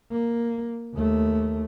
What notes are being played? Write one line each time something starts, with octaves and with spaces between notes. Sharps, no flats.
A#3
D#2 A3